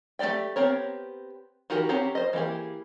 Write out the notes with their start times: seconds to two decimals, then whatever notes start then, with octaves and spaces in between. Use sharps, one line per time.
0.19 A3 F4 G4 D5 G5
0.56 B3 C4 G4 A#4 C#5
1.70 E3 D#4 F#4 G4 A#4
1.89 C4 C#4 G4 F#5 A#5
2.15 C5 D#5
2.33 E3 A#3 G4 G#4